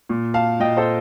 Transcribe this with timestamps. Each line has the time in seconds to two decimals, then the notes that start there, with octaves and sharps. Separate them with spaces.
0.09 A#2
0.34 F5 A5
0.60 A#2 D#5 G5
0.77 A4 C5